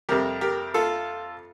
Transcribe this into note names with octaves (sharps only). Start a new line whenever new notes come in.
F2 C3 G3 G4 A#4
G4 A#4
F4 A4